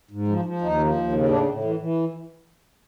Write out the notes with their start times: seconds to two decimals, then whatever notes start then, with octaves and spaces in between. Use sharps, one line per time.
0.11 G#2
0.28 F3
0.45 F3
0.62 D#2 D#4
0.78 F3
0.95 D#2
1.12 C#3
1.29 A2 D4
1.46 A2
1.63 E3
1.79 E3